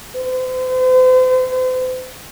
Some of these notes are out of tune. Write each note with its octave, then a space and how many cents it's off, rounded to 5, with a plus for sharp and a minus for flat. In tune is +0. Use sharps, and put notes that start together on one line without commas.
C5 -40